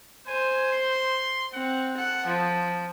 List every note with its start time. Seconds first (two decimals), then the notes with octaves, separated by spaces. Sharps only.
0.28 C5 G#5
0.73 C6
1.53 C4 F#5
1.97 A4 F#5
2.26 F3